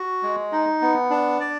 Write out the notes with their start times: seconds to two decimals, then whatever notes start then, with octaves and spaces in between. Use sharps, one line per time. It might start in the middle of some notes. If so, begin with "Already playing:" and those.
Already playing: F#4
0.23 G#3
0.52 D#4
0.82 B3
1.10 D4
1.40 D5